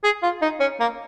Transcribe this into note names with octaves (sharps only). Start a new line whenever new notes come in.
G#4
F4
D#4
C#4
A#3